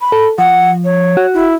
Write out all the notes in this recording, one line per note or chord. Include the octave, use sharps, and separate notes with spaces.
B5
A4
F3 F#5
C#5
F#4
E4